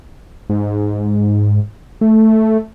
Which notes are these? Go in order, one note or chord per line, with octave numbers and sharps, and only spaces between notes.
G#2
A3